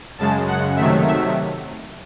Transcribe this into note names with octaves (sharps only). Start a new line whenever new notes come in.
F#2 C#3 G#3 A5
F#5
C3 D#3 F#3 A3 E5
E5